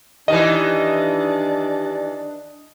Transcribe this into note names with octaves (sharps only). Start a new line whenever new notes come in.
D#3 E3 D4 G4 D#5